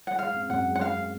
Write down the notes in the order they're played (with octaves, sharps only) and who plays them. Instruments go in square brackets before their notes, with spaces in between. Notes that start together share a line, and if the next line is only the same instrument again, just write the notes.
[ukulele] F#5
[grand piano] G#3 [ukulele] F5
[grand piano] C4
[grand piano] F#2 [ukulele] F#5
[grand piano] G#3
[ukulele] F#5
[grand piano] C4 [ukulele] F5